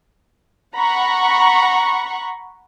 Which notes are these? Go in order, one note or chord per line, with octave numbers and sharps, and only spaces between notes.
F#5 A#5 B5 C#6